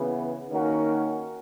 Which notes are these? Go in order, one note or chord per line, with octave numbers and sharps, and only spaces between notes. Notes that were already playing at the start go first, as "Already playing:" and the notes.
Already playing: C#3 E3 B3
D#3 A#3 C#4 F#4 A#4